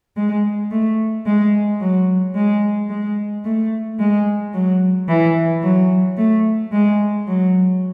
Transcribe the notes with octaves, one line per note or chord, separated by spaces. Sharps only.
G#3
A3
G#3
F#3
G#3
G#3
A3
G#3
F#3
E3
F#3
A3
G#3
F#3